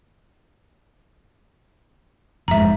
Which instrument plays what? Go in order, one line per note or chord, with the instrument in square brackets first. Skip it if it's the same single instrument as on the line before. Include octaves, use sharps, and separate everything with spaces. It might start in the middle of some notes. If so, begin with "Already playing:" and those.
[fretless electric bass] F1 G#2 [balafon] E5 A#5